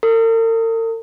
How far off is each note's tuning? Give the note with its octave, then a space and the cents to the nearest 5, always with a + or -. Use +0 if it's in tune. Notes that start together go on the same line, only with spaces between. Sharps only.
A#4 -45